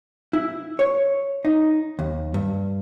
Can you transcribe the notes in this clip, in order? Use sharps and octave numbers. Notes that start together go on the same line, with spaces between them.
E4
C#5
D#4
D#2
G2